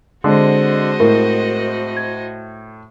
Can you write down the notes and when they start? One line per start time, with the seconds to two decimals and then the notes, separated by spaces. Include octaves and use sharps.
0.24 D3 G#3 C4 F#4 C5 D#5
1.00 A2 A#4
1.97 G#6